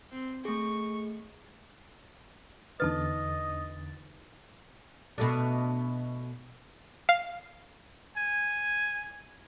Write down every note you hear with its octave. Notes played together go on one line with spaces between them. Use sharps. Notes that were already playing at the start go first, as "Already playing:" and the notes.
C4
A3 G#4 C#6
E2 D3 D#4 A4 B4 D#5 A6
B2 A3 D4
F5
G#5